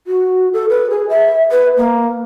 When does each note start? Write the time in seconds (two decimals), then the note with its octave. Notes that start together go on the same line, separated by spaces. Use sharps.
0.07 F#4
0.53 A4
0.69 B4
0.90 G#4
1.09 E5
1.51 B4
1.77 A#3